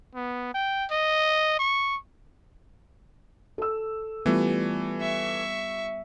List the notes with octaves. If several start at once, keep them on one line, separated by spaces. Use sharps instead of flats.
B3
G5
D#5
C#6
A4 E6
E3 G3 A3 B3 F4
E5 C#6